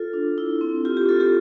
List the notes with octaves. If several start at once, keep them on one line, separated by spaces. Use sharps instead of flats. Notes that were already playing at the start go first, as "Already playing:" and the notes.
Already playing: F4 A4
D4
E4
C4
F4 G4
G4
F4 A4
G4